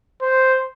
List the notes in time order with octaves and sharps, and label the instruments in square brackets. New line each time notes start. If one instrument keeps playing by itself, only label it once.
[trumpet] C5